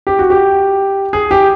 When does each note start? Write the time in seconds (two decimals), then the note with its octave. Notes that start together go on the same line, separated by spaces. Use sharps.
0.07 G4
0.19 F#4
0.30 G4
1.13 G#4
1.31 G4